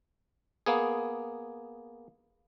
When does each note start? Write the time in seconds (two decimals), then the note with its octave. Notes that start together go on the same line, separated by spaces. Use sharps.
0.66 A#3 B3 G#4